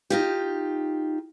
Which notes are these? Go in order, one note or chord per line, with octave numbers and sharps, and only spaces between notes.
D#4 F4 G4